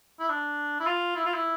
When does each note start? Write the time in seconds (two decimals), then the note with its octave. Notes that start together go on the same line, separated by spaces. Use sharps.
0.20 E4
0.30 D4
0.80 E4
0.86 F4
1.16 E4
1.25 F4
1.34 E4